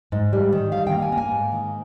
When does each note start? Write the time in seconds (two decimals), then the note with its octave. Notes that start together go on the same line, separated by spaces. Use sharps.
0.12 G#2
0.33 G3
0.53 D#3
0.72 G3 F5
0.87 A#3 G5
1.02 G#5
1.12 A#3
1.18 G#5
1.31 G#2
1.52 D#3